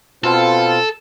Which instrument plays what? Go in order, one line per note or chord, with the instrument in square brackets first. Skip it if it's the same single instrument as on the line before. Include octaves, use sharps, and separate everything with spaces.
[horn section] B2 C4 F4 [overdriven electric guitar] A4